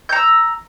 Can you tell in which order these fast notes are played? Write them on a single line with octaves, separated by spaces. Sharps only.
G6 A#5 E6